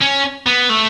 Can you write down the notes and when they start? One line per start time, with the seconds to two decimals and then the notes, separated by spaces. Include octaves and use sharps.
0.01 C#4
0.47 B3
0.70 A3